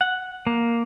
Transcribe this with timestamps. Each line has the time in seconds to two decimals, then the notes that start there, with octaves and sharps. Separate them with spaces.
0.01 F#5
0.47 A#3